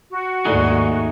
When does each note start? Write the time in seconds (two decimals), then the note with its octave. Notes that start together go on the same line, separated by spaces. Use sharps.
0.10 F#4
0.45 D#2 G#2 A3 D#4 E4 G#4 A4 D5